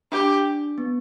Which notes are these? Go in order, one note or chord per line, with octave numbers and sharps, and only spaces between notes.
D4 G4
B3